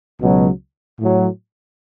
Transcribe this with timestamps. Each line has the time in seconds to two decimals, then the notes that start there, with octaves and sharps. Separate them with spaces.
0.21 C#2 B2 F#3
1.00 A2 F#3